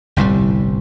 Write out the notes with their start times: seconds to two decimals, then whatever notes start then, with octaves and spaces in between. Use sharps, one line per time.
0.16 G1 C2 A2 G3